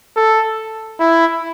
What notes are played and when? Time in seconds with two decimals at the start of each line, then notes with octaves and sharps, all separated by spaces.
0.17 A4
1.00 E4